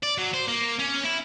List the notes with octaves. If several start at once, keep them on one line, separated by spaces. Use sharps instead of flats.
D5
F#3
C5
A#3
C#4
E4